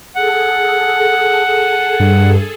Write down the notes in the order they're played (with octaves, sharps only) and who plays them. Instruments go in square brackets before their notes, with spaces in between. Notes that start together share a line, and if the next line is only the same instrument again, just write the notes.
[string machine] G#4 A4 [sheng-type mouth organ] F#5
[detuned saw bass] G2